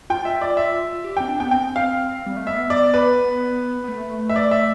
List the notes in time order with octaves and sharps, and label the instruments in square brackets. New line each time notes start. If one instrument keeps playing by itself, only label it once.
[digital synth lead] F4 [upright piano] G5
[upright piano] E5
D5
E5
[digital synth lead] G4
[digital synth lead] C4 [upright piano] G5
[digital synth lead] D4
[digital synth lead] B3 [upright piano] G5
[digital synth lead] C4 [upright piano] G5
[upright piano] F5
[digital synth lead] G3
A3
[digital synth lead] B3 [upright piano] E5
[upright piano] D5
B4
[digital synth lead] B3
A3
[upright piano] E5
D5
E5